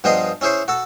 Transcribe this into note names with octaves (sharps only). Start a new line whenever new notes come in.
G2 F3 B3 G#4 D#5 C6
C#4 E4 G#4 C5 C#5
F#4 A4